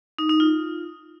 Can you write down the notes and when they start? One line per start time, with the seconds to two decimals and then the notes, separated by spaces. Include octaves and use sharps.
0.19 D#4
0.29 D#4
0.40 F4